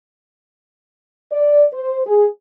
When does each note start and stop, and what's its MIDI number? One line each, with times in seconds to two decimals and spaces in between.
1.32 1.66 74
1.73 2.01 72
2.07 2.27 68